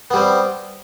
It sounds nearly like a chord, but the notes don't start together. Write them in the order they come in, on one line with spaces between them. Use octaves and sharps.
B3 G3 C4